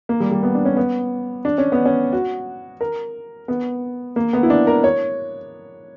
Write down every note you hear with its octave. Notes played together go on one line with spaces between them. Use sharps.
A#3
G3
G3
B3
D4
C#4
B3
D4
C#4
B3
C#4
F#4
A#4
B3
A#3
B3
E4
D4
A#4
C#5